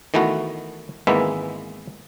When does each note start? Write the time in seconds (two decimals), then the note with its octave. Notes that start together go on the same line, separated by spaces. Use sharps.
0.14 D#3 E3 A3 B3 F#4
1.07 G#1 E3 G#3 A#3 B3 E5